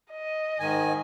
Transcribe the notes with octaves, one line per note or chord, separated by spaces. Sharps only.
D#5
G#2 D#3 G#5